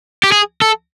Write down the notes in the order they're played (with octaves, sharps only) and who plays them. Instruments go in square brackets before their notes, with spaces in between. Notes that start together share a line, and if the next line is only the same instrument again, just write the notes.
[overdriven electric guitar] G4
G#4
A4